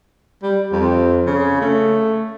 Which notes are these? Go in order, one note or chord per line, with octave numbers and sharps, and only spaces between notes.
G3
F2
C#3
A3